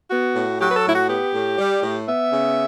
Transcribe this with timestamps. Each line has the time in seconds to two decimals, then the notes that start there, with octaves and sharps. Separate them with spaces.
0.10 B3 F#4
0.35 A2
0.60 F#3 G4
0.70 B4
0.77 A4
0.84 A2 E4
0.93 F#4
1.08 B3 G4
1.34 A2
1.58 G3
1.83 A2
2.07 B3 E5
2.32 C#3